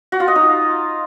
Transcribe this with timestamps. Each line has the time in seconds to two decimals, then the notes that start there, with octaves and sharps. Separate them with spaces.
0.12 F#4
0.20 F4
0.28 D#5
0.36 D#4